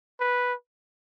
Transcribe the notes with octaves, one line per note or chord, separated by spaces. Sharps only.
B4